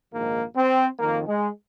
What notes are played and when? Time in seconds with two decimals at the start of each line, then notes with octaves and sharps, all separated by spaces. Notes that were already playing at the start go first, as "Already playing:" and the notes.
0.13 A#1 G#2 D#3 A#3
0.56 C4
0.99 F2 D#3 A#3
1.27 G#3